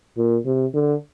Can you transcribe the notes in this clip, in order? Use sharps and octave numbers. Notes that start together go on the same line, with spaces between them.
A#2
C3
D3